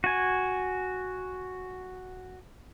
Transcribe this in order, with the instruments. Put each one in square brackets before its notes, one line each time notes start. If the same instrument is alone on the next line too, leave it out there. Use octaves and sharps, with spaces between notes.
[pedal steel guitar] F#4 G#5